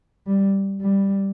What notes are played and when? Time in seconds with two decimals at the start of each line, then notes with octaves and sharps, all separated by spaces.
0.27 G3
0.82 G3